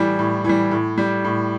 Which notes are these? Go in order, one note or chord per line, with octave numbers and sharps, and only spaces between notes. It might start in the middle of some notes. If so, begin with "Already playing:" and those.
Already playing: A2 E3 G3
A2
E3 G3
A2
G3
A2